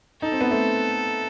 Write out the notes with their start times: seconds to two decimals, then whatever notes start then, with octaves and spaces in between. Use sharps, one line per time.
0.22 D#4 A4
0.32 C4
0.41 B3
0.51 A3 C4